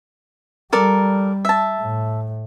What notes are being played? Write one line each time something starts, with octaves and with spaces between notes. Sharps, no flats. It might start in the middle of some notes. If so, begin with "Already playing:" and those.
G3 A4 A#4 D5
E5 A5
A2